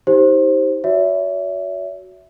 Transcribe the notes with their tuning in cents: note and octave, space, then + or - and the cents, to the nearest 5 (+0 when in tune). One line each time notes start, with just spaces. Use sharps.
D#4 +40 G4 +0 C5 +10
F#4 +0 C#5 +45 E5 +0